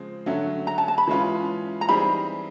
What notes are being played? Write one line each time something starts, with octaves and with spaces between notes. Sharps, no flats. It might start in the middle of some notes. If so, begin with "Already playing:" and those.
Already playing: C#3 F3 G#3 C4
D3 F#3 A3 C#4
A#5
A5
A5
B5
E3 G#3 C#4 F4
A#5
E3 G3 C4 D#4 G#4 B5